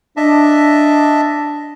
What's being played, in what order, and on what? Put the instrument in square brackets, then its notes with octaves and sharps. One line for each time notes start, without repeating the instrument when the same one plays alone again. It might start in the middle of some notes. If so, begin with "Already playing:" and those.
[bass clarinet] D4 [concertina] D#5 E5 A5